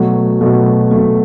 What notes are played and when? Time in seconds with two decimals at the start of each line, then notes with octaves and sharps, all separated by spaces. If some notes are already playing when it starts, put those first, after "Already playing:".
Already playing: B2 F#3 A3
0.41 B2 F#3 A3
0.91 B2 F#3 A3